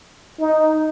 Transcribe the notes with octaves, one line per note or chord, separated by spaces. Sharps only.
D#4